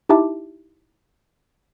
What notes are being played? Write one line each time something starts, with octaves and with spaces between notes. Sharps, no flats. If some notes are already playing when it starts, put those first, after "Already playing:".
D#4 E4 G4 E5 A5 D6